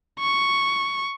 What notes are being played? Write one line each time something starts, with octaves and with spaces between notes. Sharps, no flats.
C#6